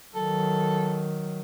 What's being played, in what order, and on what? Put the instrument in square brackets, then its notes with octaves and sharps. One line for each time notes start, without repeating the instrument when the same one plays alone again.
[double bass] D#3 F#3 [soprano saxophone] A4